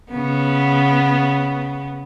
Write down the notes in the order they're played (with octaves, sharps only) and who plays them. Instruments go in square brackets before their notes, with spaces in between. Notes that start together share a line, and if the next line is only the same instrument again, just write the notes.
[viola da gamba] C#3 B3